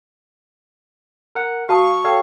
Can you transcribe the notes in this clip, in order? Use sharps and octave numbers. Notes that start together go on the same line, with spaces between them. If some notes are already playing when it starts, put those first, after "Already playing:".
A#4 F#5
F#4 F5 A5 C#6 D#6
A4 C#5 F5 G5